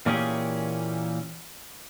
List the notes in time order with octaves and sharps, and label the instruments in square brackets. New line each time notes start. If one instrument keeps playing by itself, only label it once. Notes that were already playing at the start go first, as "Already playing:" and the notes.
[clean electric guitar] A#2 E3 A#3 C#4 G4 G#4